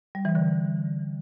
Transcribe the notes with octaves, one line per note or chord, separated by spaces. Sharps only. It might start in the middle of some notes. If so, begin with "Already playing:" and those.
G3
E3
D3